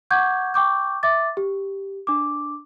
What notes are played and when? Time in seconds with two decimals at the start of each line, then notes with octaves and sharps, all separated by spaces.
0.11 F#5 C#6 D6 G6 G#6
0.54 G5 C#6 D6 G6
1.03 E5 D6 A6
1.37 G4
2.07 D4 D6